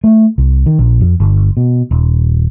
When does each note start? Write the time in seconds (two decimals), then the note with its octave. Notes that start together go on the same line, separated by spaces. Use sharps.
0.04 A3
0.38 C2
0.66 D#3
0.79 A#1
1.01 F2
1.20 G1
1.57 B2
1.91 D#1